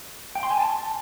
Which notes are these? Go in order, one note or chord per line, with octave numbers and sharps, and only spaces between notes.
G5
C6
G#5
A5